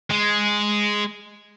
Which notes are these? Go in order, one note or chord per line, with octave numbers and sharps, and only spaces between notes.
G#3